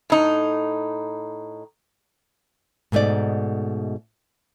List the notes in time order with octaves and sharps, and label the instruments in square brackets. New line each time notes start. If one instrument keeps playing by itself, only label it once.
[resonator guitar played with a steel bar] A2 D#4
[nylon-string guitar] G#2 B2 A3 D#4 D5